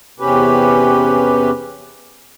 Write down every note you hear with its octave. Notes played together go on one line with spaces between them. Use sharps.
E2 C3 C#4 G4 B4